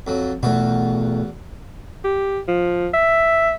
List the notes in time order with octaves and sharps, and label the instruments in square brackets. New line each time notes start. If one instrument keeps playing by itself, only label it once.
[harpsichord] F2 F#3
[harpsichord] E2 F#4 [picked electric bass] B2 A3
[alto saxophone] G4
F3
E5